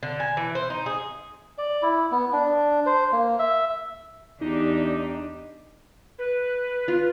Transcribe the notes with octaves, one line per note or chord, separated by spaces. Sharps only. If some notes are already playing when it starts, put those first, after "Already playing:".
D3
G#5
E3
C5
D#4
G#4
D5
E4
B3
D4
C5
A#3
E5
E2 D4 D#4 G4
B4
F4